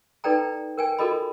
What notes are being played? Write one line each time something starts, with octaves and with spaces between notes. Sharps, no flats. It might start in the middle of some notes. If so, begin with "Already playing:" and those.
D#4 A4 B4 D5 G5 A#5
A#4 G5 G#5
F4 F#4 A4 A#4 D#5 B5